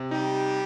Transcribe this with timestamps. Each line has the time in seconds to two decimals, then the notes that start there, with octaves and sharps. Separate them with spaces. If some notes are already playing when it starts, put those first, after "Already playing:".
Already playing: C3
0.11 G3 D#4 G4